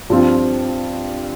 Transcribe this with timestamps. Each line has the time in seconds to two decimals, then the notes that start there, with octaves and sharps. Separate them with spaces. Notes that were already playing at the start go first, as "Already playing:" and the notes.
0.10 G2 F3 C4 F4